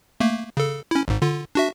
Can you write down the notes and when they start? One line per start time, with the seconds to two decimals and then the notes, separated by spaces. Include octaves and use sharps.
0.20 A3 A#3
0.57 C#3 A4
0.91 C#4 E4
1.08 G#1 G#2
1.22 D3 F4
1.55 D4 F#4 E5